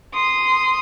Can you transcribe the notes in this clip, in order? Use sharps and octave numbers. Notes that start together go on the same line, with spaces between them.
C6 D#6